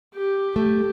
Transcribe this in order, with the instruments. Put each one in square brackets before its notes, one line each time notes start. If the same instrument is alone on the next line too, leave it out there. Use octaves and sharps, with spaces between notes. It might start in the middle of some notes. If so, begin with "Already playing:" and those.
[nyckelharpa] G4
[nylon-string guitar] A3 [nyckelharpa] G4